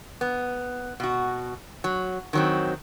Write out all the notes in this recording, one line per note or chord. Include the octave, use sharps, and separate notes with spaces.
B3
B2 F#4
F#3
D#3 F#3 C4